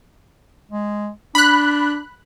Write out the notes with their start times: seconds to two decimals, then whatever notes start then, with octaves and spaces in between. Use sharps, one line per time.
0.72 G#3
1.35 D4 B5 F#6